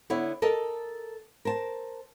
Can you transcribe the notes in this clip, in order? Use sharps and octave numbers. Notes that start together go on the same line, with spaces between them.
D3 B3 E4 C#5
A4 A#4 D#5 A5
A#4 C5 A5